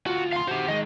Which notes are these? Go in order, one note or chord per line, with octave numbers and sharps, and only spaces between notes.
D2 F4 F#4
F5 C6
D#3 F#4 G4 C5
D#3 G#3 D#5